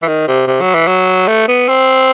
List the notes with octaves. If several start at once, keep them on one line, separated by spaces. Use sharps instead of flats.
E3
D#3
C3
C3
F#3
E3
F#3
A3
B3
C4